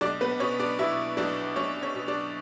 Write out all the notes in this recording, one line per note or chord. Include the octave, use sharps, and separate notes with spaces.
B1 D4 D5
B3 B4
B2 C#4 C#5
D4 D5
B2 E4 E5
B1 D4 D5
B1 C#4 C#5
C#4 C#5
B2
D4 D5